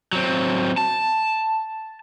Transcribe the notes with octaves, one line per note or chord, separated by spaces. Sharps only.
F#3 C4
A5